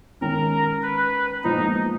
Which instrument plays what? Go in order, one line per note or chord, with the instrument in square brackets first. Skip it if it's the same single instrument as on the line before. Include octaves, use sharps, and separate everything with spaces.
[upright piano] D#3 G#3 C#4 [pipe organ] A#4
[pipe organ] B4
[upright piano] A#2 F3 G#3 B3 [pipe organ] D#4